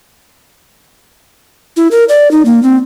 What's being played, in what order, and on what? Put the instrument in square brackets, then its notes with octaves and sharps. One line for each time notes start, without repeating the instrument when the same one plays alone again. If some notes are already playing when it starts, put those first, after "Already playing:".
[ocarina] E4
A#4
D5
D#4
A#3
C4